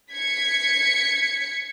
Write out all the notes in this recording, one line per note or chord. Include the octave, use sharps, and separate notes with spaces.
G#6 B6 C#7